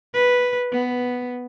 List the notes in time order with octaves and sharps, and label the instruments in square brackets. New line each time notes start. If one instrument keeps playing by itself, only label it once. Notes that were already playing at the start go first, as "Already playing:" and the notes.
[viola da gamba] B4
B3